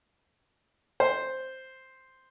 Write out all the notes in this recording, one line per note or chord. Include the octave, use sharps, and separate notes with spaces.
C5